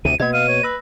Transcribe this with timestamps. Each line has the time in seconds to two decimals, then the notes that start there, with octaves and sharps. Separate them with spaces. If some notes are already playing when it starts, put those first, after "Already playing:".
0.05 D2 C3 D#7
0.20 B2 A#3 D#5 G#6
0.33 F5 D#7
0.48 C#5
0.63 B4 E6 A#6